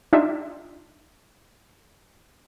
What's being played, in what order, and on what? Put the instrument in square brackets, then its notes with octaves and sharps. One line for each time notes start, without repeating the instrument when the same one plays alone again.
[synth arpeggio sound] D4 D#4 F4 G4 E5